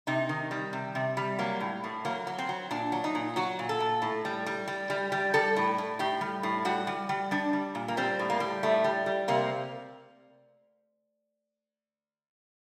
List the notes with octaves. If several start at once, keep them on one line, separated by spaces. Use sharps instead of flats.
C3 D#4
D#3
G3
C3
C3
G3
F#3 A#3
A2
A2
F#3 A#3
F#3
C4
F#3
A#2 D4
F#3
D#4
A#2
F#3 F#4
A#2
A4
A#2
A2
G3
G3
G3
G3
G3
G3 A4
A2
A2
A2 G4
G3
A2
G3 F#4
G3
G3
G3 D4
G3
A#2
A#3
G3 C4
A2
A#3
G3
A2 A3
G3
G3
C3 A#3